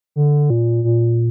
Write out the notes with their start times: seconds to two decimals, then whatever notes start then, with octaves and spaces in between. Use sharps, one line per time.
0.16 D3
0.50 A#2
0.84 A#2